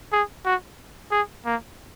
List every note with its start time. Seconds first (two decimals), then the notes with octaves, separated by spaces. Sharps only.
0.12 G#4
0.45 F#4
1.11 G#4
1.45 A#3